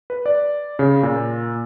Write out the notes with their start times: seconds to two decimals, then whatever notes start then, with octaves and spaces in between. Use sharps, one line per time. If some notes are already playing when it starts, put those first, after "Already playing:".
0.10 B4
0.26 D5
0.79 C#3
1.03 A#2